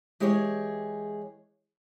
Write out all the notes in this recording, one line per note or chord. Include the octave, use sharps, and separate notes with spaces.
E3 G#3 G4 G#4 C#5